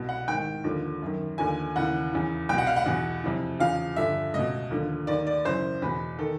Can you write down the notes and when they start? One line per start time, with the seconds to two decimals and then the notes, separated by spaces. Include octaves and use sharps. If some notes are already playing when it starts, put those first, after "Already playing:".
Already playing: C2 B2
0.09 F#5
0.28 G#2 D#3 G5
0.64 D#2 D3 F3
1.02 F#2 D#3
1.38 D#2 D3 F3 G#5
1.76 D#2 C#3 E3 F#5
2.13 E2 C#3 E3
2.49 C2 B2 G5
2.58 F#5
2.67 F5
2.76 F#5
2.86 E2 B2
3.24 F2 C3 E3
3.60 E2 C#3 F3 F5
3.96 G2 D3 F3 E5
4.34 C#2 B2 D#5
4.70 D#2 D3 F3
5.07 D#2 D#3 D5
5.27 D5
5.45 F#2 C#3 E3 C5
5.82 E2 B2 B4
6.19 D#3 A4